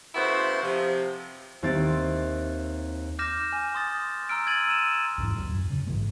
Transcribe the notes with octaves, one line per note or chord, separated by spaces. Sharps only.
C#3 A3 B3 E4 F#4 C5
C3 F3
D#2 C4 G4 E5 A6 D7
D6 F6 G6 A#6 E7
G#5
C6 D#6 A6
A#5 C6 E6 F6 D7
G#6 A6 D#7 F#7
E6 D#7 E7
D#2 G#2 E3
D#2 A2 F#3
F#2
C#3
A1 G#2 E3 A3